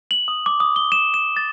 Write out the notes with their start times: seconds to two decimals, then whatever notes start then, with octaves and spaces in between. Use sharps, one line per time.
0.11 F#7
0.28 D#6
0.46 D6
0.60 D#6
0.76 G7
0.92 E7
1.14 E7
1.37 A6